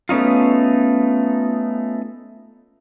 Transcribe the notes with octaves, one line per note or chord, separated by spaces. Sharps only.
A3 B3 C#4 D#4 F4